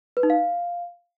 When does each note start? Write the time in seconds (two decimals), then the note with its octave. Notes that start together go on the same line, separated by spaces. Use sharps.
0.17 B4
0.23 D#4
0.30 F5